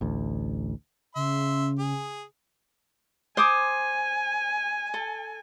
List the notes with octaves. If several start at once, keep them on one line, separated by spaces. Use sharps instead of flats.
A1 D2
C#3 E5 C6
G#4
C5 G#5 D6 D#6
A4